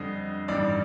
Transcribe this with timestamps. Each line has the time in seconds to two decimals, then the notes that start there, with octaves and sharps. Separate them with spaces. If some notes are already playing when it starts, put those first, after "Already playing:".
Already playing: F2 D3 G3 D#5
0.48 A1 G2 D#3 G3 D5